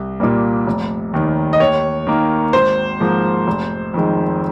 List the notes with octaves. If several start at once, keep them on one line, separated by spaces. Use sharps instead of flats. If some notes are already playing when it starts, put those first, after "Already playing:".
Already playing: C2
A#2 G3 A#3
F1
D#2 D#3
D#5
D#2 C#5
D#3 A#3
G#1 C5
G#2 F3 A#3
F1
F2 D#3 G#3